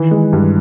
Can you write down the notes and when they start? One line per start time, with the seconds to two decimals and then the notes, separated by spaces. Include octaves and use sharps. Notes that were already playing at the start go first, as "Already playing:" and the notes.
Already playing: D#3 E3
0.11 G#3
0.33 G2